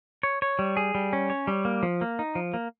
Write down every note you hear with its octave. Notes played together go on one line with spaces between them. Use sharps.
C#5
C#5
G3
G#4
G3
C#4
C#5
G3
A#3
F3
A#3
D#4
F3
A#3